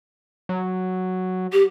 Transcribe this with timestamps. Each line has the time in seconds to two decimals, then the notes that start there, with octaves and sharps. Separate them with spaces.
0.49 F#3
1.53 G4